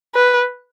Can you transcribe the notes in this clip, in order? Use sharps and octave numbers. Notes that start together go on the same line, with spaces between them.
B4